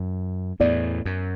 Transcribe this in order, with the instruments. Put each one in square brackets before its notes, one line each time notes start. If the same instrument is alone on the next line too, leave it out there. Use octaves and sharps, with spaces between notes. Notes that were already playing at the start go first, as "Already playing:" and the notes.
Already playing: [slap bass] F#2
[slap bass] E2 A2 [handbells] B3 E4 D5
[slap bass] F#2